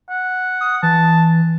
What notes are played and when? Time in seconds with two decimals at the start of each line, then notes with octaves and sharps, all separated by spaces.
0.10 F#5
0.61 D#6
0.83 E3 A5